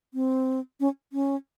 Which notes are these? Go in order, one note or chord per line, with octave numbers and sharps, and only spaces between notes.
C4
C#4
C#4